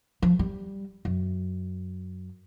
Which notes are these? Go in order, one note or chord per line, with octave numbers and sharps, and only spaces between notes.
F3
G3
F#2